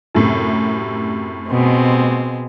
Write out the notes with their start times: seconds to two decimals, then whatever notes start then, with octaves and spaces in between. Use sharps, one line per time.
0.15 F#2 A2 C3
1.49 B2 G#3 C4